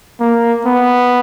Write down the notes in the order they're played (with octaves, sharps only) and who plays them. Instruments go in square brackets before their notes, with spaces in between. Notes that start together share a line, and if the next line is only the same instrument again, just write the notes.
[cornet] A#3
B3